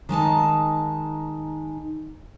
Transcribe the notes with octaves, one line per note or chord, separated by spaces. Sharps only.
D#3 G#3 D#4 A5